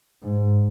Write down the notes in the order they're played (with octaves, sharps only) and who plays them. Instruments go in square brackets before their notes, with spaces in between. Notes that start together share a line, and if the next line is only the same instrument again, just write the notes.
[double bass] G#2